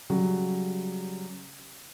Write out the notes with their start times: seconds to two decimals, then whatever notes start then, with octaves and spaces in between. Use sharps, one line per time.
0.10 C#3 F#3 G3